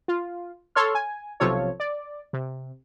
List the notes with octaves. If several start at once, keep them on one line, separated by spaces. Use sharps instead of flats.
F4
A4 C#5 C6 F6
G#5
B1 C3 F3 F4 A4 C#5
D5
C3